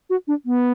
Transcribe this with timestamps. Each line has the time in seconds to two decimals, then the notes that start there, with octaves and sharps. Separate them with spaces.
0.10 F#4
0.28 D4
0.46 B3